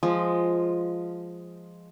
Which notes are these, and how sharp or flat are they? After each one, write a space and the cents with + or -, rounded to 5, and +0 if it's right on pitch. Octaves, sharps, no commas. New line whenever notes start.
F3 +0 G#3 +0